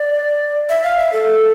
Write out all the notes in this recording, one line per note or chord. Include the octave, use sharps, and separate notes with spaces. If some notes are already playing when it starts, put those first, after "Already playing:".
Already playing: D5
E5
F5
E5
A4